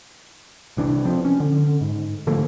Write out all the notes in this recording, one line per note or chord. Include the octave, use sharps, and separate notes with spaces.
C2 E3 D4
F3 C4
C#4
D3
G#2
D3 F3 A3 A#3